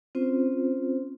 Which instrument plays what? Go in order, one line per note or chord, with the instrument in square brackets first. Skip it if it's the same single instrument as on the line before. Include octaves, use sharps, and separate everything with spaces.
[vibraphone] C4 C#4 F4 C5